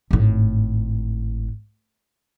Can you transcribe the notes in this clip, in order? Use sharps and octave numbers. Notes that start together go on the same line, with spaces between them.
G#1 A2